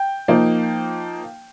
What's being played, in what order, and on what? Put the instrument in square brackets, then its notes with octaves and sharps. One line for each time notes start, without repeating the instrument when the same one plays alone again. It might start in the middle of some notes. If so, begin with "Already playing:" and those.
Already playing: [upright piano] G5
F3 A#3 D#4